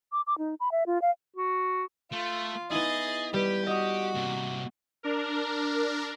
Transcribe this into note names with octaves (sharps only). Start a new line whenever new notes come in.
D6
D6
D#4
B5
E5
F4
F5
F#4
A3 F4
B3 D#4 E4 G#4 D#5 G#5 A6
G3 G4 B4
F#4 D#5 D#6
C3 A#3
D4 A#4